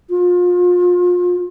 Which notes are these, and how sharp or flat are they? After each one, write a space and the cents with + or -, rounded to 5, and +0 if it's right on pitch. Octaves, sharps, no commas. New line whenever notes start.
F4 +30